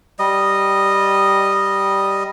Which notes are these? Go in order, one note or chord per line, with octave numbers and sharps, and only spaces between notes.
G3 D#5